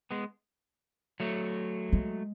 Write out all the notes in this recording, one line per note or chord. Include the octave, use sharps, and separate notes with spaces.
G#3 B3
F#3 A3
G#3